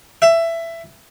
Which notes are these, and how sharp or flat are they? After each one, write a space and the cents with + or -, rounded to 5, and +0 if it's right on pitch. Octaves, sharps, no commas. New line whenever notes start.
E5 +15